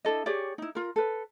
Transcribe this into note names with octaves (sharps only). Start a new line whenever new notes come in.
D4 E4 A4 D#5
G4 G#4 C#5 D5
D#4 E4
F4 A#4
A4 B4